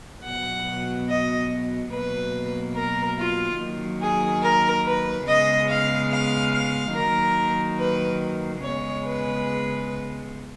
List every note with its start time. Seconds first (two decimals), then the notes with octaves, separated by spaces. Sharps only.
0.23 B2 F#3 B3 F#5
1.07 D#5
1.91 B2 F#3 A#3 B4
2.74 A#4
3.17 F4
3.59 D#3 F#3 A#3
4.01 G#4
4.42 A#4
4.85 B4
5.26 C#3 G#3 B3 D#5
5.68 F5
6.10 F5
6.53 F5
6.94 D#3 F#3 A#3 A#4
7.78 B4
8.62 C#3 G#3 B3 C#5
9.04 B4